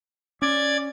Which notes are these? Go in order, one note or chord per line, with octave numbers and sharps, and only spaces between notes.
C#4 D5 G#6